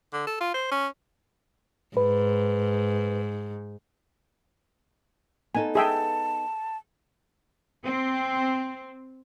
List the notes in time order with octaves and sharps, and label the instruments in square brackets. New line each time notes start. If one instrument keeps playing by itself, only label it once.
[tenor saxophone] D3
A4
F4
C5
C#4
[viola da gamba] G#2 [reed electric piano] B4
[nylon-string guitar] B3 D#4 A4 [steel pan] G#5
[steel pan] G#4 E5 G5 [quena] A5
[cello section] C4